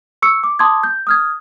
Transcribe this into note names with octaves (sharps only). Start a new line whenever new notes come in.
C#6 E6 C#7
D6
A5 C6 D6 D#6 G#6
G6
D#6 F6 G#6